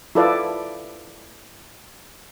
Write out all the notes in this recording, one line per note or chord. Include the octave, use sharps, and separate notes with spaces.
E4 F4 A4 B4 D5 F5